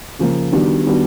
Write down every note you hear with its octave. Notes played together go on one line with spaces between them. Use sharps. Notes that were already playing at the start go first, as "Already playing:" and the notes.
C#3 F3 A#3
D#3 G3 B3 D4 F#4
D#3 G3 B3 D4 F#4